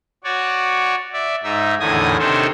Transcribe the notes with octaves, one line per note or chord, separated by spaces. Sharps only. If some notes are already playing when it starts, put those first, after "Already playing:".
F#4 C#5 D5
D5 E5
G#2 D#4 E5
E2 A2 D3 D#3 G#5 D#6
C3 D#3 D4 A4 C5 C#5